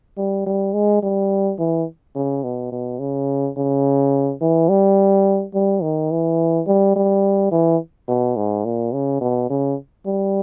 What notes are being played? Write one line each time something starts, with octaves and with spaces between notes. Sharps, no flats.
G3
G3
G#3
G3
E3
C#3
B2
B2
C#3
C#3
E3
G3
G3
D#3
E3
G3
G3
E3
B2
G#2
A#2
C#3
B2
C#3
G3